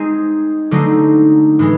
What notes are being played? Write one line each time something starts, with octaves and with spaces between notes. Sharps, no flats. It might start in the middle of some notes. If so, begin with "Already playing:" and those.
Already playing: G#3 C4 D#4 G#4
D3 F#3 A3 C4 D#4
A2 E3 G#3